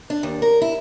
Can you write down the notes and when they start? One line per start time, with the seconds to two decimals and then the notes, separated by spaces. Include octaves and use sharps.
0.10 D4
0.23 D#2
0.42 A#4
0.62 E4